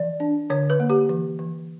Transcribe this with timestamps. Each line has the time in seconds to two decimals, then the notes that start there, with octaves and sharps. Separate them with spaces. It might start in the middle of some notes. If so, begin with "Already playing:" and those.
Already playing: E3 D5
0.20 D4
0.50 D3 C#5
0.70 B4
0.80 A#3
0.90 G4
1.09 E3
1.39 E3